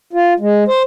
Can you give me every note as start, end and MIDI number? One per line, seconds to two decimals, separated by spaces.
0.13 0.33 65
0.40 0.64 56
0.68 0.83 72